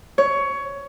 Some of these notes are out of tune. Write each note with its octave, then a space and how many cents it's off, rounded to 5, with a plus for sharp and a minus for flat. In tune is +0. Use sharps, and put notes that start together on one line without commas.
C#5 +15